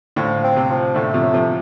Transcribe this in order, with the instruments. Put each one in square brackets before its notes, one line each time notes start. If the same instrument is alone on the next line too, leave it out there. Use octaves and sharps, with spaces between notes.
[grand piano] A2 D3 [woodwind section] F3
[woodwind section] C4
[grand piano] C3
[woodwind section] F3
[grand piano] A2 D3 [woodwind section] A3
[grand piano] C3 F3
[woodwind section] A2
[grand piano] C3 F3